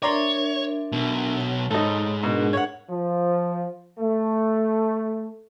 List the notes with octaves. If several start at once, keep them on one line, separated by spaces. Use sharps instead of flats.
D4 A#4 C#5 D5 E5 A#5 C6
B1 B2
C#5 A5
G#2 D#4 A4 C#5 B5
B2 D4 G#4 A#4
C#5 F#5
F3
A3